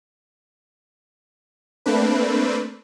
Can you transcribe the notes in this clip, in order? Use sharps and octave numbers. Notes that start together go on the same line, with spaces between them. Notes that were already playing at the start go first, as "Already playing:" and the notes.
A3 A#3 C4 D4 B4